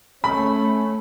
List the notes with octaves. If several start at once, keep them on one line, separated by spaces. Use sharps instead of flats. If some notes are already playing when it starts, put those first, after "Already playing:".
A3 C#4 B5